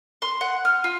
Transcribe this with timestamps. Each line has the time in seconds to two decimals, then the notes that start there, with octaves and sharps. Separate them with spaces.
0.22 C6
0.41 F#5
0.65 F6
0.84 F4